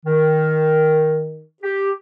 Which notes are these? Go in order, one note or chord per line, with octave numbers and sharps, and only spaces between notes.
D#3
G4